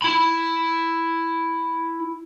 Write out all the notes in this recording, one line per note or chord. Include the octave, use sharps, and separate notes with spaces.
E4 B5